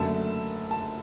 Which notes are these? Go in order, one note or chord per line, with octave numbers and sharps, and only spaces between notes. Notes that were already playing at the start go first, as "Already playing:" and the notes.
Already playing: F#1 F#2 D3 A3 A5
A5